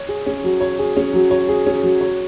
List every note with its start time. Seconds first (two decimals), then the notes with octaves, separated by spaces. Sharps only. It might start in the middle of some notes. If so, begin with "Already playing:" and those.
Already playing: C#5
0.09 G#4
0.26 C#4
0.44 F#3
0.61 C#5
0.79 G#4
0.97 C#4
1.14 F#3
1.31 C#5
1.49 G#4
1.66 C#4
1.83 F#3
2.01 C#5